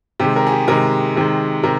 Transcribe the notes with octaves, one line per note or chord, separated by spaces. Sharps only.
C3 D#3 G#3 G4
A#4
G#4
G4
C3 D#3 G#3 A#4
C3 D#3 G#3
C3 A#4